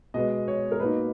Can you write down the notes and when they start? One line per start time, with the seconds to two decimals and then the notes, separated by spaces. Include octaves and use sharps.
0.14 B2 G#3 B3 D#5
0.48 C#5
0.72 A#4
0.80 B2 A#3 D#4 B4